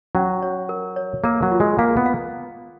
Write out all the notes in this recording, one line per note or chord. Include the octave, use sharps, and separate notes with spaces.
F#3 C#4
C#5
A#4
C#5
A#3 A#4
F#3
F4
G#3
A#3 F5
B3
F5